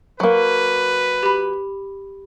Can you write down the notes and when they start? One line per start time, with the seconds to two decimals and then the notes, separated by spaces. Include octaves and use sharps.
0.20 F#3 A#3 B4
1.23 G4 B5